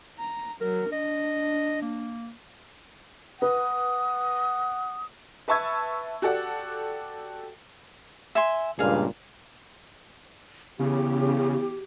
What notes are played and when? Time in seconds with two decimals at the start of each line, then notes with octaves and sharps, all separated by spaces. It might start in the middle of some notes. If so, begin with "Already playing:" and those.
0.19 A#5
0.61 F#3 A#4
0.92 D4 D#5
1.82 A#3
3.42 B4 F#5 D#6
5.48 B4 E5 A5 C#6 E6 G#6
6.22 F#4 G4 A4 D5 F#5
8.35 E5 G#5 C6
8.79 C#2 G2 A#2 G#4 F5
10.79 E2 C#3 G4